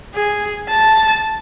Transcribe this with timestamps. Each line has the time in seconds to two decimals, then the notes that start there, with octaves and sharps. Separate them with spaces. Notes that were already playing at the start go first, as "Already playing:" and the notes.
0.15 G#4
0.69 A5